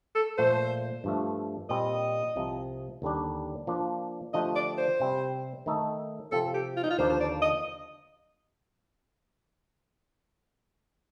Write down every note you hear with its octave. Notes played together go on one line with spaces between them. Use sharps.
A4
A#2 F3 A3 C5
G2 F3 A3
A#2 G3 C4 D#5
C2 C3 F3
D#2 D3 G3 D4
F3 A#3 D4
D3 F3 A3 D4 G4 D#5
D5
C5
C3 G3 C4
D#3 A3 D#4 A4
C3 F3 C4 A4
G4
F4
D#4
F4
D#2 D3 F3 A#3 D4 C5
C5
D5
D#5